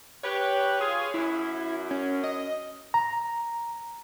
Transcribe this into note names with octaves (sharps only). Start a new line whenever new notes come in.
G4 B4 C#5
F4 G#4
F#2 E4
C#4
D#5
A#5